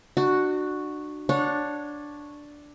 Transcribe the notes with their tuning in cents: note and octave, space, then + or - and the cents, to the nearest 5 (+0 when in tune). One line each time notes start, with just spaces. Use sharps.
D4 +35 F#4 +0
D4 +0 C#5 +0 F#5 -30